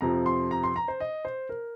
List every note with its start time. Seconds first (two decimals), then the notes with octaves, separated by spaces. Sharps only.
0.01 F2 C3 F3 A#5
0.26 C6
0.51 A#5
0.63 C6
0.76 A#5
0.88 C5
1.00 D#5
1.25 C5
1.49 A#4